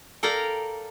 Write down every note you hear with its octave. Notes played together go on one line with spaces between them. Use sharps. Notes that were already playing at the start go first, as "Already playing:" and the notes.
A4 A#4 D5 F5 G5 A#5